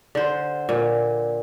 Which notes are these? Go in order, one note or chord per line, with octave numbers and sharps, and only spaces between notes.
D3 C5
A#2